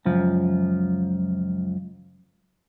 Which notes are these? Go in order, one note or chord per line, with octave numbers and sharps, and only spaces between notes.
C#2 F#2 F3